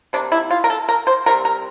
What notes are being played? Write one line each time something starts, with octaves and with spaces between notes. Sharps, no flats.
C3 G3 A#3 D4
E4
F4
A#4
A4
A#4
C5
C3 G3 C4 A#4
A#4